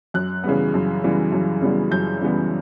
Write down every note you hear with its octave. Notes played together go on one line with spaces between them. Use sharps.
F#2 F#6
C#3 E3 G3 B3
F#2
C#3 E3 G3 B3
F#2
C#3 E3 G3 B3
F#2 G6
C#3 E3 G3 B3